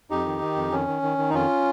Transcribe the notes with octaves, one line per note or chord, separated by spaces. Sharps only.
F2 D#4 G4
D#3
D#3
F2
D#3 C#4
D#3
D#3
D#3
D#4
F2 C#4 F4